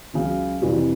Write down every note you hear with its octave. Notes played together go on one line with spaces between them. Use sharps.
C#2 C#3 F#3
F2 C3 E3 G3